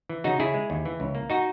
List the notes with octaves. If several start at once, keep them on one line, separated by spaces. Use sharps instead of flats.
E3
C#3 D#4 F#4
C#3 E4 G#4
G#3
D#2
E3
C#2
A#3
D#4 F#4